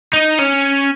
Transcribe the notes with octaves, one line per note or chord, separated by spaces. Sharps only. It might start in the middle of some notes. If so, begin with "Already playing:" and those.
D#4
C#4